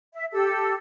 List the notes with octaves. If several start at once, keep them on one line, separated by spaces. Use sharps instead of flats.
E5
G4 A4 E6